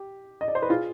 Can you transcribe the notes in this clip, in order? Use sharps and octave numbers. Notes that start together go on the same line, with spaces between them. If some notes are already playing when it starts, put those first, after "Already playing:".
Already playing: G4
D#5
D5
C5
B4
F4 G#4